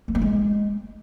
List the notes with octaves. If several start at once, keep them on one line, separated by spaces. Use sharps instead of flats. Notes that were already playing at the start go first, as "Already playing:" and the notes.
A#3
B3
G#3